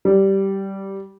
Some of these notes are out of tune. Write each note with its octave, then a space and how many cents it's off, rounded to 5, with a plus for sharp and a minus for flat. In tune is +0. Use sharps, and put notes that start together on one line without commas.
G3 -10